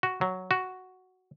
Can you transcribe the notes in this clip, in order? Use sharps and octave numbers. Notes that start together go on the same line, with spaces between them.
F#4
F#3
F#4